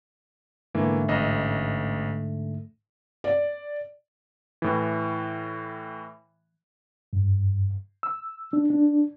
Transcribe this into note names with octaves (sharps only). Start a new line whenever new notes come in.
G#2 D3 E3 A3 A#3
A1 D#5
D5
A2 E3
G2
E6
D4
D4